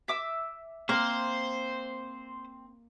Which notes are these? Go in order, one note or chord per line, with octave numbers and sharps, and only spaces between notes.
E5 D6 E6
A#3 C4 C5